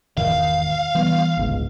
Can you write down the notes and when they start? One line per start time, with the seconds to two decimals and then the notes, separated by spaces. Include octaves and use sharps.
0.17 E1 G#2 D#3 F5
0.95 E3 G3 B3
1.37 G1 C#2 G#2